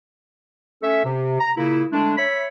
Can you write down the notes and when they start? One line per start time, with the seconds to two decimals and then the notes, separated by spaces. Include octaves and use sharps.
0.83 A3 C#4 A4 E5
1.05 C3
1.39 A#5
1.56 A#2 C#3 A#3 E4
1.92 D3 G#3 A3 D4
2.17 C#5 E5 B5